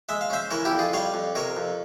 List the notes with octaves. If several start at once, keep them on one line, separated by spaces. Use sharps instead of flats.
G#3 E5
F5
C#4 C5 E5
E3 A#4 C#5
E4 G4
F2
F4 G#4
G3 C#5 F5
F2
C3 A#4 C#5
F2